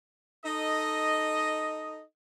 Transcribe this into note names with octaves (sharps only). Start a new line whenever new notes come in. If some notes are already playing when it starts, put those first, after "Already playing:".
D#4 A4 D#5